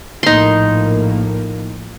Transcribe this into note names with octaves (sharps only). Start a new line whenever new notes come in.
A#1 A2 A#3 D#4 C6